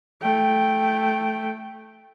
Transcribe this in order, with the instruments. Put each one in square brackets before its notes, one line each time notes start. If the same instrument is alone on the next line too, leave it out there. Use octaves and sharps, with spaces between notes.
[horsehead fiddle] A3 G5